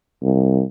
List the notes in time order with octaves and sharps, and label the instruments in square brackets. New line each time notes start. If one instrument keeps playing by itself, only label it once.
[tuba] C2